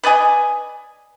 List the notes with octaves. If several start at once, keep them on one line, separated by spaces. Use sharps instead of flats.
B4 D5 D#5 G#5